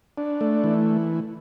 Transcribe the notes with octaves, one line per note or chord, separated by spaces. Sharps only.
D4
A3
E3